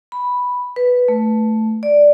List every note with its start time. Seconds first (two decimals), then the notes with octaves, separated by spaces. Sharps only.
0.12 B5
0.76 B4
1.08 A3
1.83 D5